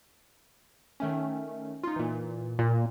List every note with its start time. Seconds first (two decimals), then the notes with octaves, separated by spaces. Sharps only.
1.00 D#3 A3 C#4
1.83 D#4 F4
1.96 A#2 E3
2.59 A#2